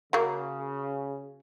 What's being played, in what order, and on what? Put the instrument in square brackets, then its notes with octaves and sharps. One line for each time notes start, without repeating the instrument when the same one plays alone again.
[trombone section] C#3 [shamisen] F#3 A#3